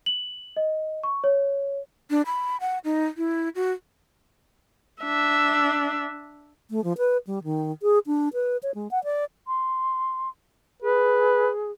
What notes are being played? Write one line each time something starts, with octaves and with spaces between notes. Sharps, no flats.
F#7
D#5
C#6
C#5
D4
B5
F#5
D#4
E4
F#4
D4 E5
A3
F3
B4
G3
D#3
G#4
D4
B4
C#5
G#3
F#5
D5
C6
G#4 B4